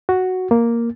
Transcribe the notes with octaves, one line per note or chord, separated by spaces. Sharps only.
F#4
A#3